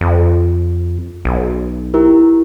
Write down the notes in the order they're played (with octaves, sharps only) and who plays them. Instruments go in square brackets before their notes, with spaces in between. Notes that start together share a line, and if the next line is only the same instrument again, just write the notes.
[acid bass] F2
B1
[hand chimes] E4 G4 A#4